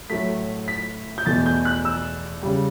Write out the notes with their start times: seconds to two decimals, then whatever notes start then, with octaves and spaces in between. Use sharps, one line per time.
0.10 A2 F#3 A3 B6
0.68 B6
1.18 G6
1.26 E2 B2 A3 A6
1.46 G6
1.65 F#6
1.85 E6
2.43 C#3 G3